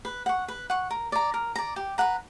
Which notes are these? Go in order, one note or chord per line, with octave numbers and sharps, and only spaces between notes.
B4
F#5 C#6
B4
F#5 C#6
A#4
D5 A#5
A#4
D5 A#5
G4
B4 F#5 A#5